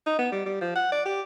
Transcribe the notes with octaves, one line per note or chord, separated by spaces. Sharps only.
D#4
B3
G3
G3
F3
F#5
D5
G4